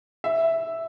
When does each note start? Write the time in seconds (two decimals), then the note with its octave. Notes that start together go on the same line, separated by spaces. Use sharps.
0.24 E5